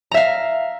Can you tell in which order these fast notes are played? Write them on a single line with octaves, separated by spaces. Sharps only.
A#5 E5 F5